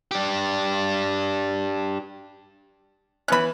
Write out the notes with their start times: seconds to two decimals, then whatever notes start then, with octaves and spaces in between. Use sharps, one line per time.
0.11 D4 G4
3.28 E3 B3 C#4 B5 F#6